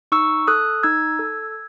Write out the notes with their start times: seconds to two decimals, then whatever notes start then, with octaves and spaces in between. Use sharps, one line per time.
0.12 D#4 C#6 E6
0.47 A4 D#6 F#6
0.83 D#4 E6 G#6
1.19 A4